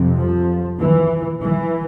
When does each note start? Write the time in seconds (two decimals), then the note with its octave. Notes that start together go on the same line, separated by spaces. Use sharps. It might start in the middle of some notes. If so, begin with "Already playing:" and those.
Already playing: F2 C3
0.18 F3
0.80 E3
1.42 E3